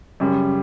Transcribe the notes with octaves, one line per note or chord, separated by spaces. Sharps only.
F#2 C#3 G3